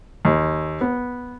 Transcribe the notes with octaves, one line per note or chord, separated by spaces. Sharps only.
D#2
B3